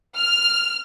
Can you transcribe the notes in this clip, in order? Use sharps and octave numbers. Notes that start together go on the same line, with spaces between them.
F6